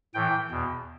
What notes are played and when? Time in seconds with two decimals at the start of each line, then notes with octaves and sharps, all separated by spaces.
0.14 A2 E3 G5
0.51 E2 B2